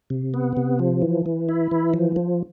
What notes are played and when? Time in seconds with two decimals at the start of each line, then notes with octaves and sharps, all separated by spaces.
0.10 C3
0.34 B3
0.57 C3
0.79 F3
1.02 E3
1.26 E3
1.49 E4
1.71 E3
1.94 F3
2.16 F3